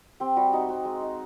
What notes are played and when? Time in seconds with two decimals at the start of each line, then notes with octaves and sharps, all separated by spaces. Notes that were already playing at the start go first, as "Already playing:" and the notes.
0.20 C4 G4
0.36 G3 F#4
0.53 D#4 F#4
0.69 C4 F#4
0.85 G#3
1.01 D#4